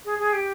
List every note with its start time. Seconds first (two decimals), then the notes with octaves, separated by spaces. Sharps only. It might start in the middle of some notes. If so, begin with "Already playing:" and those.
0.05 G#4
0.18 G#4
0.33 G4